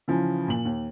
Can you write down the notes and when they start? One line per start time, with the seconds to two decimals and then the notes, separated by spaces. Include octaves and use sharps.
0.08 C#3 E3 F3
0.48 A#2 F#7
0.65 D#2